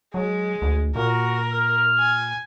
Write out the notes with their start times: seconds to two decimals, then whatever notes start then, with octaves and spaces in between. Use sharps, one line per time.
0.14 F#3 G#3
0.62 D2
0.96 A#2 F#4 A#4
1.53 F6
1.99 G#5